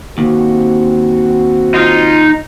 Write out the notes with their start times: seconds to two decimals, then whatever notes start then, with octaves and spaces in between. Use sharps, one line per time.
0.18 D#2 C4 F#4
1.74 D#4 F4